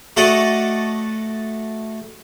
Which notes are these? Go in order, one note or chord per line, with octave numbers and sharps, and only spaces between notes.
A3 F#4 A4 D5 D#5 F#5